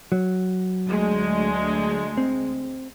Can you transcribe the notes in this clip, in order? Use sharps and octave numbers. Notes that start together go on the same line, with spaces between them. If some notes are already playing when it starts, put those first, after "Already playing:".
F#3
D2 G#3
C4